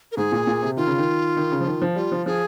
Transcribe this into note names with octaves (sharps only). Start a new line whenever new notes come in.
A#4
G#2 G#4
A#2
A#2
C3
D#3 F4
C#3
D#3
D#3
C#3
F3
D#3
F3
G3 F4
F3
F3 G#4